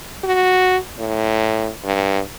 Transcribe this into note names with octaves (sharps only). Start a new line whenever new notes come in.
F#4
A2
G2